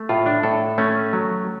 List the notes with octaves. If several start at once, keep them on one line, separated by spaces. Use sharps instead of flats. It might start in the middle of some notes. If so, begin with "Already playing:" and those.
Already playing: A3
A2 F4
D4
A2 A4
A3 C#4
F#3